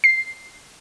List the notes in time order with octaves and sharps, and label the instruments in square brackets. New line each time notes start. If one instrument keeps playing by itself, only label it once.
[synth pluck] C7